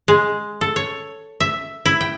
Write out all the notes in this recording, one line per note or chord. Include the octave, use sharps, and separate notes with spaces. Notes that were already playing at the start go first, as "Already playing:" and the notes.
G#3
A4
C#5
E5
E4
G5